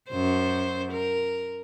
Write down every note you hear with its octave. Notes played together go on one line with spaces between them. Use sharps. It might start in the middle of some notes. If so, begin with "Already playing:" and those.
F#2 C5
A#4